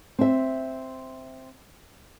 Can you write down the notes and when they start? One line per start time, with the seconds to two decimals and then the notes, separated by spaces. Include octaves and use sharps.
0.19 C4 E5